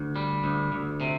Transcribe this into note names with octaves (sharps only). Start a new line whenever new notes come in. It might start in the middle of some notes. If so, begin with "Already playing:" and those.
Already playing: D2
G3
D2
D2
C3